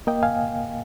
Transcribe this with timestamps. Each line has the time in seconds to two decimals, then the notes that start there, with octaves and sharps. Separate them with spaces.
0.07 A#3 D#5 G5
0.23 F5 G#5